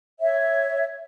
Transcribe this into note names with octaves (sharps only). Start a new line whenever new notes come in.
C#5 E5